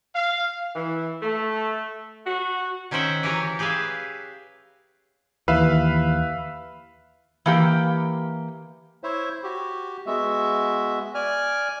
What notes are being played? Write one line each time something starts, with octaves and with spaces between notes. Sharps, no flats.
F5
E3
A3
F#4
D#3 C#4 C5 E5 F#5 G5
E3 F#3 G4 A#4 C#5
G4 G#4 B4 E5 F5
D#2 E3 B4 E5 F5
E3 A#3 G4
E4 C5 C#5 E5
F#4 G4
G#3 B3 F#4 E5
D5 G#5 F6